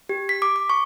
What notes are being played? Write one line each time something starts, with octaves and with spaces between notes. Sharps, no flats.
G4
B6
D6
D6
C#6